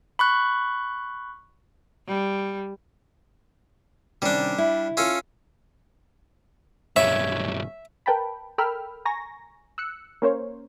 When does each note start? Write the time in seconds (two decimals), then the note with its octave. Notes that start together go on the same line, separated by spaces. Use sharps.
0.19 B5 C#6 F#6
2.07 G3
4.22 C3 D#3 G3 C#4 D4
4.58 E4
4.97 C#4 F4 A4
6.96 D1 B1 G2 C#4 E5
8.06 A#4 B4 G5 A5 B5
8.58 A4 A#4 G5 B5 E6 F6
9.05 G#5 A#5 C#6 A#6
9.78 E6 F#6 C#7
10.22 A#3 C#4 A#4 C5 C#5